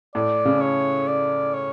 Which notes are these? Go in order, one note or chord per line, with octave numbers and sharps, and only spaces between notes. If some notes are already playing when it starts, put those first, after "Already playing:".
A2 D5
C#3
C#5
D5
C#5